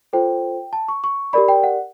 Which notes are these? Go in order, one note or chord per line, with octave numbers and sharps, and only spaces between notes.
F4 A4 C5 G5
A5
C#6
C#6
G4 A#4 D5 B5
G5
F#5